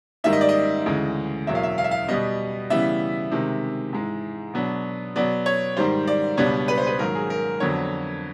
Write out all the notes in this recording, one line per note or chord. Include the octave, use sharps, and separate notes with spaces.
G#2 D#3 G3 A#3 D#4 E5
D#5
D5
D#5
D2 C#3 E3 G#3
E2 B2 F#3 A#3 E5
F5
E5
F5
E5
F5
B2 G3 B3 D#5
C#3 E3 G3 B3 E5
C3 D#3 G#3
G#2 E3 G#3
B2 F#3 B3 D4
B2 F#3 B3 D5
C#5
G#2 D#3 G3 C5
D5
C#2 B2 G3 B3 D4 C#5
B4
C5
B4
G#2 D#3 F#3 A#3 A#4
G#4
A#4
F2 D3 F#3 B3 C#5